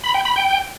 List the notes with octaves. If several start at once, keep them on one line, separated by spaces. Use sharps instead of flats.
B5
G5
B5
G5